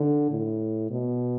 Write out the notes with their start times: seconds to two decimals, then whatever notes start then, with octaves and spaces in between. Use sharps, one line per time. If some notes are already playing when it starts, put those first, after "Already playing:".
Already playing: D3
0.31 A2
0.90 B2